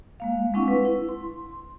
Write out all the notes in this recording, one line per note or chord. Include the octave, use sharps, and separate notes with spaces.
G#3 A#3 F5
G#3 C4 D4 E4 F#5 C#6
B4
E4
C6